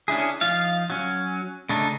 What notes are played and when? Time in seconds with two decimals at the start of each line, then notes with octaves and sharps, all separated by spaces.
0.08 C#4 D4 E4 G#4
0.41 F3 D#4 F4 F5
0.90 F#3 C#4
1.69 C#3 A3 D4 D#4